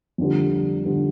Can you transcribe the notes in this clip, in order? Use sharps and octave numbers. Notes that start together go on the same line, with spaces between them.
F2 D3 G3
D3 G3